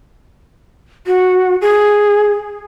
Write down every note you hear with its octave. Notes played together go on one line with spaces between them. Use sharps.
F#4
G#4